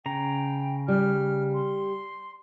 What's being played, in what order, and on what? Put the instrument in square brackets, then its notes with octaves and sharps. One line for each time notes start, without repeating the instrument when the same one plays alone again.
[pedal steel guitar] C#3 A#5 [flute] G5
[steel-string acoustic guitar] G3 [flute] F6
[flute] C6